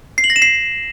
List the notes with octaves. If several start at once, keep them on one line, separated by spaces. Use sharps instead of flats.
C7
F#7
A#6
E7
C7